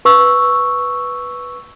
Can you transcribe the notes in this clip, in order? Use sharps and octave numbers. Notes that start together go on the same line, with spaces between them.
B4 C#6 E6